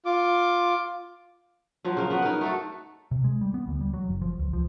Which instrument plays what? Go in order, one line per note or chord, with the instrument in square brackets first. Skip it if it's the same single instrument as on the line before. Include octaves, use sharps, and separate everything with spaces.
[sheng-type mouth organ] F4 D6
[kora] F3 F#3
C#3 A#4
B3 F#4
D#4 A#4
A3 F#4 A4
[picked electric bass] C3
G#3
G3
B3
D2
G3
F#3
F#1
F3
C#2
F3